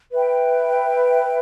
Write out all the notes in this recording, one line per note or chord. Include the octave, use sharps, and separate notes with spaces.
B4 E5 G5